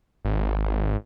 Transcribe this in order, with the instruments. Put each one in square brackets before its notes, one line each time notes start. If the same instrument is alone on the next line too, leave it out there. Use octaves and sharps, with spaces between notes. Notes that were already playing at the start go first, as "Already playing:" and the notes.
[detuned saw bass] G#1